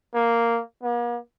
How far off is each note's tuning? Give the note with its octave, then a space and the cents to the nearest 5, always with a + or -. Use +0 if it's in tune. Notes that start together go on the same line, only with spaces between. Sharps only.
A#3 -5
A#3 +45